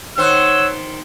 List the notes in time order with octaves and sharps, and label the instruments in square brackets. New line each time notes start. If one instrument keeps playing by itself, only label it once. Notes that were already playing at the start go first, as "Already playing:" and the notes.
[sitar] D#3 C5 [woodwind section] C#5 F#5 [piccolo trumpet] E6